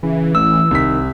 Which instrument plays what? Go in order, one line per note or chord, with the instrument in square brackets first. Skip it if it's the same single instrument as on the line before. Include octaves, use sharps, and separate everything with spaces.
[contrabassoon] C#3 [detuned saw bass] E3
[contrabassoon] A1 [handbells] E6
[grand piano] C2 B6 [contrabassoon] D#3